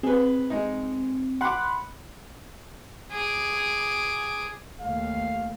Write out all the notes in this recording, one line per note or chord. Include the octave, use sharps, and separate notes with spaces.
C4 G#4 B4
G#3 D#4
F#5 B5 C6 D6 F#6
G#4 D6
D#2 A3 F5